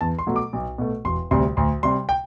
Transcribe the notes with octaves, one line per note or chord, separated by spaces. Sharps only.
E2 A5
C6
B2 F#3 A3
D6
B1
B2 A3
E1 C6
D2 C3 G3 C6
D2 C6
C3 G3 C6
G5